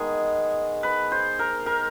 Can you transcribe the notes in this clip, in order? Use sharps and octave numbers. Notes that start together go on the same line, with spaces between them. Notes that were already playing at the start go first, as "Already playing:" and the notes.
Already playing: D#3 G#3 B3 G#4
B4
C5
A#4
A#4